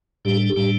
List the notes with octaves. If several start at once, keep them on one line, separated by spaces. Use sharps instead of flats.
A2 G3 D4 G4
A4
G4
A2 G3 D4